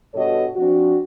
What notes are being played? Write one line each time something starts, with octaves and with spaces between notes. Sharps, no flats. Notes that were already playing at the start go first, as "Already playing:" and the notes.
G2 B2 F#4 A4 C#5 D#5
F3 C4 D4 F#4